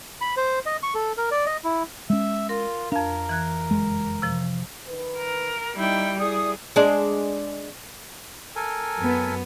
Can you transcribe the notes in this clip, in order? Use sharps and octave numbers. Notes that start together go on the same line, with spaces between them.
B5
C5
D#5
C#6
A4
A#4
D5
D#5
E4
G#3 C#4 E5
F4 A#4
F2 D4 A#4 F5
E3 F#6 G#6
F#1 G#3
C3 F3
D#3 B4
A#4
G3 D#4 E4 G5
E4 G#4 D5 D#6
G#3 D4
A4 A#4 G#5
F#2 B3